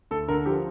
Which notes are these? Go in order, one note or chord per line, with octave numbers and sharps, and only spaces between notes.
D2 A4
D3 A#4
F3 G4